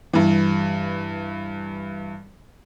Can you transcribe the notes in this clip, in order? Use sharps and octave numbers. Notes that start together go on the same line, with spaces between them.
G2 E3